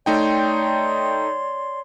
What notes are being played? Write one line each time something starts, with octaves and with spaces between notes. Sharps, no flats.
A3 D#4 C#5 D5 G5 C6